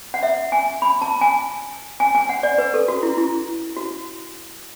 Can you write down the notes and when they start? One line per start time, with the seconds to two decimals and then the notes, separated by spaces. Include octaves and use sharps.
0.14 F#5
0.23 E5
0.52 G#5
0.82 B5
1.02 A5
1.21 G#5
2.00 G#5
2.15 G#5
2.29 F#5
2.43 D5
2.58 B4
2.74 A4
2.88 F#4
3.03 E4
3.18 E4
3.77 F#4